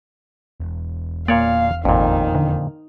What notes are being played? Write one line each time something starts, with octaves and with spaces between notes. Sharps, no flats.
E1
A#2 A#3 C#5 D5 F5
G#1 F2 A#2 D#3
D3